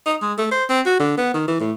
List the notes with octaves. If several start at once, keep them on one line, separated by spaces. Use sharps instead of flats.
D#4
G#3
A3
C5
C4
F#4
D3
B3
D#3
E3
A2